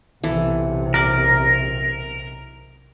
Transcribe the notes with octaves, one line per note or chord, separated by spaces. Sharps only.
B1 C3 E3 A4
A#4 D5 D6